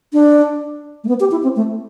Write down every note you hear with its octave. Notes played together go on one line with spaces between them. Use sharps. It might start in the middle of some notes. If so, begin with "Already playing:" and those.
D4
A3
B3
G4
E4
C4
A3